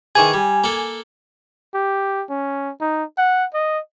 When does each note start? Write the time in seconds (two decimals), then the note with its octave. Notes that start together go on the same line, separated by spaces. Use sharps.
0.15 D#3 E3 G#4 G#5
0.34 G3
0.64 A#3 A4
1.74 G4
2.30 C#4
2.81 D#4
3.18 F#5
3.54 D#5